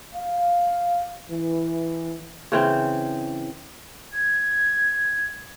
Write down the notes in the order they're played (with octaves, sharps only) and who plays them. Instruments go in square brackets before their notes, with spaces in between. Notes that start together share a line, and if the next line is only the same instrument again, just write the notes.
[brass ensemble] F5
E3
[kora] C#3 E3 C4
[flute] G#6